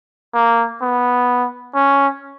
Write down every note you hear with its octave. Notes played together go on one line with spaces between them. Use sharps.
A#3
B3
C#4